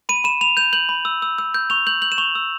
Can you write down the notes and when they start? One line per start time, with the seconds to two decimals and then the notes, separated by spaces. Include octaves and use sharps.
0.09 B5 D#7
0.24 B5 E7
0.41 B5 F7
0.57 G6 F7
0.73 G6 F#7
0.89 B5
1.05 E6
1.22 E6
1.38 E6
1.54 G6
1.70 C#6 F7
1.87 G6 F#7
2.02 G6 F#7
2.12 E7
2.18 C#6 F7
2.35 E6